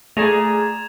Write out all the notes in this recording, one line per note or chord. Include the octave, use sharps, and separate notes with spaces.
A#2 A3 G#4 D5 A#5 G#6 E7 F7